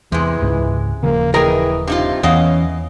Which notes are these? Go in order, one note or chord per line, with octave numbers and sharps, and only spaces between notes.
E2 C3 E3 G#3
C#2 G#2
D#1 C#3 F3 A#3
E3 G#4 A#4 D#5 G5 A#5
G2 C3 D#4 F4
E2 E3 B3 C#4 D#5 F5